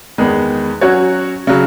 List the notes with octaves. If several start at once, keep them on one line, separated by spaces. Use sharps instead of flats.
E2 D#3 G#3 B3
F#3 C#4 F#4 C#5
C#3 F#3